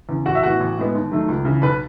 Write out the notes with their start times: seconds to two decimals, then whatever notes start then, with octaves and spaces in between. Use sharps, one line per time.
0.09 E2 C#3
0.26 A1 F#4 F#5
0.35 E5
0.43 A2 E3 B3 F#4 F#5
0.60 A1
0.77 A2 G#3 B3
0.95 D#2
1.11 D#3 F#3 A3
1.28 C#2
1.45 C#3 E3
1.62 B1 B4 B5